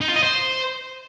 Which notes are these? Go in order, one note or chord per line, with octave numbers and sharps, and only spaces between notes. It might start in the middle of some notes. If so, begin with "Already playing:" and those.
D#4
F4
D#5
C5